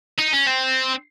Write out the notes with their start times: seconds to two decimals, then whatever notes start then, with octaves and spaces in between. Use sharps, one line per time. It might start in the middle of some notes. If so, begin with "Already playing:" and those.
0.19 D#4
0.33 C#4
0.47 C4